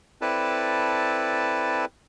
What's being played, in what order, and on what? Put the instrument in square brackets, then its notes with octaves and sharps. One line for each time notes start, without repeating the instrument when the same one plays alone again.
[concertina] C4 E4 A4 B4 D5 A5